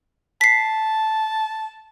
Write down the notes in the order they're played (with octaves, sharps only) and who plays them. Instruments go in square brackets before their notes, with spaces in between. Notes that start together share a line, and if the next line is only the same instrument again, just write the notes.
[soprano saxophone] A5 [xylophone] B6 C7